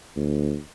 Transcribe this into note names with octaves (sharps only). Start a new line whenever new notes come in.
D2